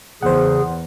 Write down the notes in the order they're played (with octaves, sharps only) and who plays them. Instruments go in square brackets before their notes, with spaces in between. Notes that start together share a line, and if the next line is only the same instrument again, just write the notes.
[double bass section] E2 [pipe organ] C#3 G#4 [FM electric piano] C5 F#5